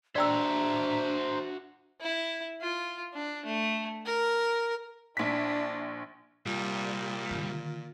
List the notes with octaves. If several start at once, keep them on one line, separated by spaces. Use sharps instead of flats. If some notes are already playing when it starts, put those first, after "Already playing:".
D4 F#4 C5 D5 E5 G5 A#5 E6
E4
F4
D4
A3
A#4
A#1 D4 E4 B6
C2 A#2 G3
D3 D#3